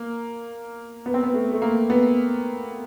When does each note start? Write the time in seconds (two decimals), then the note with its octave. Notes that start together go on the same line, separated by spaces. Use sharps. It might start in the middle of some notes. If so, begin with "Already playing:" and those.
Already playing: A#3
1.06 B3
1.14 C4
1.24 B3
1.34 A3
1.52 A3
1.62 A#3
1.90 B3